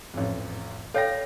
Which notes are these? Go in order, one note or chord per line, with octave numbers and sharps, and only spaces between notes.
A1 F2
A4 C#5 F5 G5 A#6